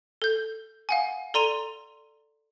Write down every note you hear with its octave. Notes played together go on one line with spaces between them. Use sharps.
A4 G6
F5 F#5 G#5
A4 D5 A#5 C6 D#7 F7